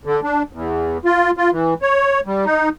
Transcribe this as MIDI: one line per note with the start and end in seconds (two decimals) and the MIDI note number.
0.05 0.20 50
0.23 0.43 62
0.53 0.98 40
1.05 1.31 65
1.37 1.50 65
1.52 1.74 52
1.82 2.20 73
2.26 2.45 55
2.45 2.69 63